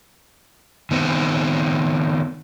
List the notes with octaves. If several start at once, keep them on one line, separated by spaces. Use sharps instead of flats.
D#3 B3 C4